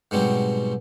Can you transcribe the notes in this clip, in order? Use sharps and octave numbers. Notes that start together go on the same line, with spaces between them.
G#2 B2 F#3 G3 C4